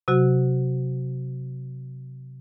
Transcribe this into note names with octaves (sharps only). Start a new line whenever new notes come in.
C3 F#3 F#4